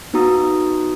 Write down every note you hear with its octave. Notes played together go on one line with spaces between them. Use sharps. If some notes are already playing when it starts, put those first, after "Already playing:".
B3 D#4 F#4 A#5 D#6